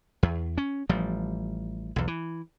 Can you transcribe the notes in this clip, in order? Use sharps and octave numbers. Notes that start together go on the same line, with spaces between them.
E2
C#4
A1 F3 G3
B1 E2
E3